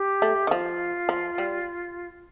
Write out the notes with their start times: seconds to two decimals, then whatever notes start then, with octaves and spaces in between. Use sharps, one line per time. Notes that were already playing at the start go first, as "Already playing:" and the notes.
Already playing: G4
0.22 A3
0.47 D#3
0.51 F3 F4
1.09 F3
1.38 G3